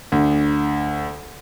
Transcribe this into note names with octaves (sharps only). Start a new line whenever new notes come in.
D2